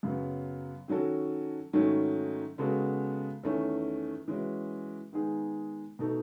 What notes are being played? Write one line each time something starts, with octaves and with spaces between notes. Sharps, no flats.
F#2 C#3 F#3 B3
D#3 F#3 C#4 F#4 A4
G#2 D#3 F#3 A3 C#4
C#3 G#3 B3 F#4 A4
E2 D#3 A3 C#4 E4
E3 G#3 C#4 F#4 B4
D#3 G#3 B3 D#4 G#4
B2 A3 D#4 A4